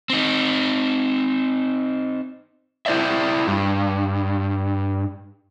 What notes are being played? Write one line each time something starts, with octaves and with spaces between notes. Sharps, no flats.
C4 D#4
E4 C5 D5 E5
G2